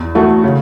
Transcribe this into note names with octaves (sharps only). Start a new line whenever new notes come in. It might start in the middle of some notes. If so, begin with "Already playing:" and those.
Already playing: E2
E3 A3 F#4
C#3